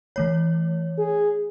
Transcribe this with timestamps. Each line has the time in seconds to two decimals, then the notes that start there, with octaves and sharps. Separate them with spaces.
0.16 E3 A3 C#5
0.99 G#4